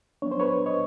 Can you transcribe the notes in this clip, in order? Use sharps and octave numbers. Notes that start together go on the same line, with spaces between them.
F#3 B3 D4 C#5
C5
B4 C#5
C#5 D#5